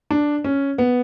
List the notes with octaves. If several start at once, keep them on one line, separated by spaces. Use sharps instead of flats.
D4
C#4
B3